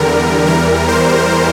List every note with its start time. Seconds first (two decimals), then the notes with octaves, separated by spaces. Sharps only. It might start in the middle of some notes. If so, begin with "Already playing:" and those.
Already playing: E2 D3 G3 A#4
0.46 E2 E3 G3 A#4
0.88 C5